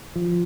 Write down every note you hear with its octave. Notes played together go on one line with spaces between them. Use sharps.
F3